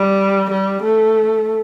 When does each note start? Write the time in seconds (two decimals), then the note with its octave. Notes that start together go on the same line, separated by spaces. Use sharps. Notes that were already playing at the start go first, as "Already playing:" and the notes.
Already playing: G3
0.50 G3
0.83 A3